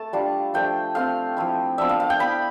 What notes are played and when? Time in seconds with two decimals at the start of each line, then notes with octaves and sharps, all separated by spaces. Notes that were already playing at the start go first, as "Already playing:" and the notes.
Already playing: A3 A5
0.13 G3 D4 F4
0.54 F3 A3 D4 F4 G5
0.95 A3 C4 F4 F5
1.37 F3 A3 E4
1.78 F3 B3 D4 E5
1.89 F5
2.00 F5
2.10 G5
2.19 B3 E4 B5